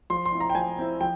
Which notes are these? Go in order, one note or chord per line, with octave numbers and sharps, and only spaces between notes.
F3 C6
C6
C4 E4
A#5
G5
F3 G#5
C4 E4
F3 G5